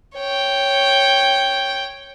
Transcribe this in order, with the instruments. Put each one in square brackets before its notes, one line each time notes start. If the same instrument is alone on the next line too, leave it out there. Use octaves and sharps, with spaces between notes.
[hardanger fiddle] C#5 G5